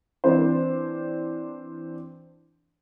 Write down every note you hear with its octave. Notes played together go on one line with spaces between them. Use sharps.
E3 C4 D4 C5